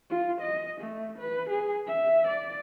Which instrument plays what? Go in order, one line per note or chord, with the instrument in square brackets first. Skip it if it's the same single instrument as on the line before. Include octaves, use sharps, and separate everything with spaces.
[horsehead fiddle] F4
D#5
A3
B4
G#4
E5
D5